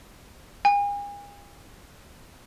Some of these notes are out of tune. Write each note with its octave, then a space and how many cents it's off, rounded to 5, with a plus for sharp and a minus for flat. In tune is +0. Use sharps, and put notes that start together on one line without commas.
G#5 -40